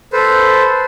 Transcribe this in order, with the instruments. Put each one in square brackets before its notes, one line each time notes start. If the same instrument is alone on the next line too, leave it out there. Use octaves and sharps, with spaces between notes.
[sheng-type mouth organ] A4 B4 C5